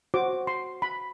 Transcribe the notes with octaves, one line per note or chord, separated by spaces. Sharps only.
F#4 C5 D6
C6
B5